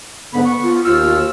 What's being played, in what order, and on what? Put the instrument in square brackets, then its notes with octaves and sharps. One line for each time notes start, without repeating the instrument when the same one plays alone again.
[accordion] G#2 D3 B5 [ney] B3
[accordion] C#6
[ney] F4
[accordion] D#2 E6 F6 [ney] F4